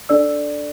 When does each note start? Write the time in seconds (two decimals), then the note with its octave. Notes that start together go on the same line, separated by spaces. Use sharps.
0.09 D4 A4 D5 E6